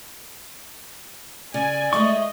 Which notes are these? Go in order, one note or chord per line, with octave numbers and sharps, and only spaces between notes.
C#3 D5 G#5
G#3 A3 E4 D#5 C#6